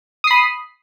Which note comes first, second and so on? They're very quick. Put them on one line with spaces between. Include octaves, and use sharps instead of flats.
D#6 C7 B5